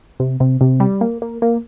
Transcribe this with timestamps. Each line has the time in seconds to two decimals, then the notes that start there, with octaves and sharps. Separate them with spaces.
0.20 C3
0.40 C3
0.61 C3
0.80 G3
1.01 A#3
1.22 A#3
1.42 A#3